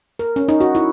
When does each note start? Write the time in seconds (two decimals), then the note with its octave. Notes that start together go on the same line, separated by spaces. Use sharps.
0.19 A#4
0.36 C#4
0.49 D#4
0.61 F#4
0.75 E4